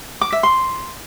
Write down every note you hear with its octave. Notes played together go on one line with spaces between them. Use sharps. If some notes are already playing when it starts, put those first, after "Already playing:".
D6
E5
C6